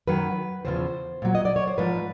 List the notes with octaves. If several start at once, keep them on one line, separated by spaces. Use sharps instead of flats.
F#2 D#3 F#3 B4
E2 C#3 F3 C5
A#2 F#3
D#5
D5
C#5
C5
G#2 F3 B4